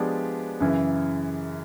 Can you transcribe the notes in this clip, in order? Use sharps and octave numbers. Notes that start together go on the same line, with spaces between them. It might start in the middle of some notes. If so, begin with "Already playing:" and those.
Already playing: F3 G#3 B3 D4 G4
F#2 C#3 E3